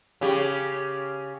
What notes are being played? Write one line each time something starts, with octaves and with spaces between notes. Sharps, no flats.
C#3 G4